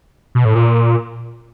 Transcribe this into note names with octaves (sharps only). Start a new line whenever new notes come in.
B2
A2
A#2